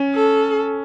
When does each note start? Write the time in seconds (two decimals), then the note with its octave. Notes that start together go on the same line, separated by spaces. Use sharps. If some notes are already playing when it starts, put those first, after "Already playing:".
Already playing: C#4
0.15 A4